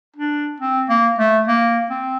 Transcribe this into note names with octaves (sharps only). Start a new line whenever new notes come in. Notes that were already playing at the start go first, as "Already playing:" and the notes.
D4
C4
A#3
A3
A#3
C4